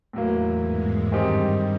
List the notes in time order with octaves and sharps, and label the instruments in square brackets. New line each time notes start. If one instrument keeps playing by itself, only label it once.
[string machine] E2 E3 [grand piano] A2 F#3 A#3
[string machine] G#2 G#3
[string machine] G2 G3 [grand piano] D#3 G#3 C4 D#4 G4